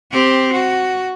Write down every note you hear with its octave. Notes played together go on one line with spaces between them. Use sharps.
C4 G4
F#4